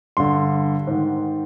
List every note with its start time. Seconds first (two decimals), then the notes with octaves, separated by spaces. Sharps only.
0.17 G2 D3 C6
0.87 G#2 D#3